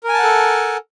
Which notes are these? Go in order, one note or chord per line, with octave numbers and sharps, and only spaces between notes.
A4 A#4 F#5 G#5 A5